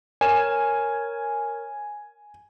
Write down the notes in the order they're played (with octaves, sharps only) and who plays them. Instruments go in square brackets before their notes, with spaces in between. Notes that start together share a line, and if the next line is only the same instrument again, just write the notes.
[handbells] A#4 C#5 [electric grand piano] G#5 E7